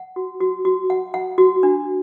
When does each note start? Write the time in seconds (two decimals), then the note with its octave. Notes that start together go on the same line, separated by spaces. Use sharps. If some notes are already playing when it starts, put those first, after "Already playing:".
Already playing: F#5
0.16 F#4
0.41 F#4
0.65 F#4
0.90 F#5
1.14 F#5
1.38 F#4
1.63 D4